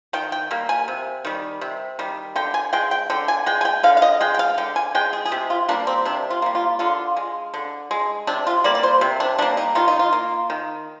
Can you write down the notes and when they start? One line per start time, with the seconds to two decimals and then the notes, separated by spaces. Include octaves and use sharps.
0.13 D#3 G5
0.32 G5
0.51 G3 A#3
0.69 G#5
0.88 C3
1.25 D#3 G3
1.61 C3
1.99 D#3 G3
2.36 D3 G5
2.54 G#5
2.73 G#3 G5
2.91 G5
3.10 D3 G5
3.28 G#5
3.46 G#3 G5
3.61 G#5
3.65 G5
3.83 D3 F5
3.97 F5
4.02 D#5
4.21 G#3 G5
4.34 G5
4.39 F5
4.58 D3 G5
4.76 G#5
4.95 G#3 G5
5.13 G#4
5.26 G#4
5.32 C3 G4
5.50 F4
5.68 G3 A#3 D4
5.87 C4
6.05 C3 D4
6.30 F4
6.42 G3 A#3
6.55 F4
6.79 D3 F4
7.16 G#3
7.54 D3
7.91 G#3
8.27 C3 D4
8.47 F4
8.64 G3 A#3 D5
8.75 D5
8.83 C5
9.01 C3
9.20 D4
9.38 G3 D4
9.42 A#3
9.57 D#4
9.75 D#3 F4
9.88 D#4
9.99 F4
10.12 A#3
10.50 D#3